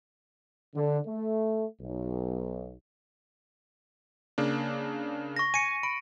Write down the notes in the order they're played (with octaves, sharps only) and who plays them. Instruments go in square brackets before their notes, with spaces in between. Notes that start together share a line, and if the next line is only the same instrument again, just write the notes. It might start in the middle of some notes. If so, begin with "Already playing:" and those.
[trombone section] D3
A3
B1
[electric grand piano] C#3 A#3 D4
[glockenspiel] C#6 A#6
[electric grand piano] G#5 [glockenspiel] C#7 D#7
[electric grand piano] B5 [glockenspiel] D7